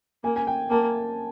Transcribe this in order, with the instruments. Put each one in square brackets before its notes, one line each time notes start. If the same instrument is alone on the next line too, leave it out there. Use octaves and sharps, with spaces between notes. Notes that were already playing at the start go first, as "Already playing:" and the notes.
[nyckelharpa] A#3 [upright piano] G#5
[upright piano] G#5
G5
[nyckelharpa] A#3 [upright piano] A5